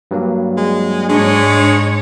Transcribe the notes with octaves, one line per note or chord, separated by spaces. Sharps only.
G2 F#3 A#3
G#3
G#2 G#3 D4 C#5